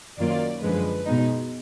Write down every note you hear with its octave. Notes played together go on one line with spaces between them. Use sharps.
F#2 D#3 F#3 A#3 F4 D5
F#2 D3 F3 G#3 B4
B2 G#3 B3 D#4